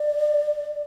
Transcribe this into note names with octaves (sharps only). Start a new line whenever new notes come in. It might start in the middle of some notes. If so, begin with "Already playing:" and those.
Already playing: D5